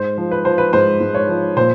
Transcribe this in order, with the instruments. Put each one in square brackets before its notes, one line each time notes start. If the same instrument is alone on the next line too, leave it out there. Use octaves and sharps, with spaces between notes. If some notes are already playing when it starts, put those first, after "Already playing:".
Already playing: [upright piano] G#2 C5
F3
B4
F3 C5
B4
G#2 C5
G#2
C#5
F3
A#2 C5